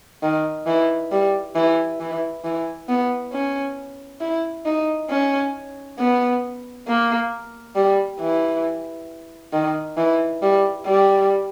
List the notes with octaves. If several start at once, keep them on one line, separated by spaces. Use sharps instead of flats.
D#3
E3
G3
E3
E3
E3
B3
C#4
E4
D#4
C#4
B3
A#3
G3
E3
D#3
E3
G3
G3